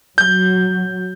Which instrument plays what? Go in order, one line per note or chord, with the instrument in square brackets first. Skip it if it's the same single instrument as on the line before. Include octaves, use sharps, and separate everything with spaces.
[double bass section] F#3 [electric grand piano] G6